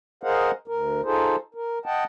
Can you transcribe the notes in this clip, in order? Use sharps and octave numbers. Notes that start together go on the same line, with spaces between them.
G#4 A#4 C5 D#5 F5 F#5
D2 A#4
D#4 F4 G#4 A4 C5
A#4
D#5 F#5 G5 A5